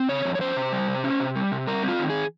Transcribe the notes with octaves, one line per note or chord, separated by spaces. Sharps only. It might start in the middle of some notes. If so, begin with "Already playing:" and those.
Already playing: C4
C#3 C#5
F2
C#5
C#4 C5
C3
G3
C3
C#4
C3
G3
C3
G3 A#4
C4
F4
D#3
G#4